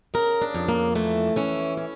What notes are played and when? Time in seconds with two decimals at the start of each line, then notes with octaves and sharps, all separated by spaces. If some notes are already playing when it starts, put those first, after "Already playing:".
0.14 C#3 A#4
0.42 D4
0.54 F2
0.69 A#3
0.95 E3 A3
1.36 E3 C#4
1.77 C#4